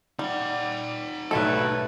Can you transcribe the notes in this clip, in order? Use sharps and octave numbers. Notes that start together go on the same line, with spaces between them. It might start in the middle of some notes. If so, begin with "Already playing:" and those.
G3 D#4 F#5
B1 F#3 G3 A3 E4 A4 B4